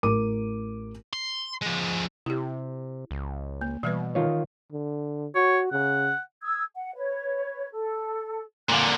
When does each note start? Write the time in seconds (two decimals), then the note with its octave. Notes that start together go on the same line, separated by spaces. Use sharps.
0.03 A1 A#4 D6 D#7
1.13 C6
1.62 F3 G#3
2.26 C3 E4 G4
3.11 C#2
3.61 A#3
3.83 B2 E3 G3 B4
4.15 D#3 F4 C#5
4.72 D3
5.35 F#4 C#5
5.72 C#3 F#5
6.41 D#6 E6 G#6
6.76 F#5
6.95 B4 C#5
7.72 A4
8.70 A#2 D3 F5 G#5 F#6